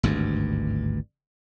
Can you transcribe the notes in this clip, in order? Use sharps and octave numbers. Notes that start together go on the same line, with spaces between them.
G#1 D2 G2